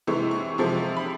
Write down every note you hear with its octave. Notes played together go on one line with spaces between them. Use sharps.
C3 E3 G#3 C#6
C#6
C3 F3 G#3
B5